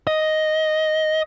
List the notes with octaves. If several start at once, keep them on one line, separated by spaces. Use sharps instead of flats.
D#5